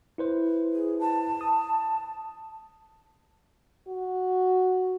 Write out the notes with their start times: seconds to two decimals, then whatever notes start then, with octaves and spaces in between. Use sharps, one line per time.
0.18 E4 B4 C5
0.73 G#4
0.99 A5
1.41 D#6
3.87 F#4